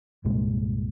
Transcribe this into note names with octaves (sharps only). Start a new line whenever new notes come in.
C2 G2 A#2 G#3